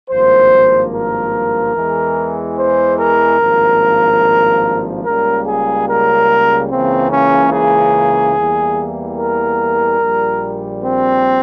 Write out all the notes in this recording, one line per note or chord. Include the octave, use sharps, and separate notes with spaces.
G#1 G2 F3 A#3 C5
A#4
E2 E3 G#3
C5
A#4
G#1 G2 F3 A#3
C#2 C#3 G3 A#3 A#4
G#4
A#4
C#2 C#3 E3 A#3 C4
C#4
G#4
E2 E3 G3 A#3
A#4
A#1 A#2 G3
C4